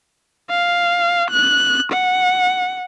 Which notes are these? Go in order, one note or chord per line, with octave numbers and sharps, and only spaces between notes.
F5
F#6
F#5